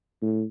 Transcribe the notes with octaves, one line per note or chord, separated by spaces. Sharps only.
A2